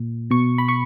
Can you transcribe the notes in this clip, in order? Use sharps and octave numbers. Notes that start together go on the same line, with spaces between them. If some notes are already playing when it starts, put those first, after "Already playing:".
Already playing: A#2
B2 C#6
B5
C#6